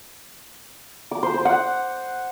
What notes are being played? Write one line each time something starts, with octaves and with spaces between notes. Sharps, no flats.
D6
C5
C5
F#5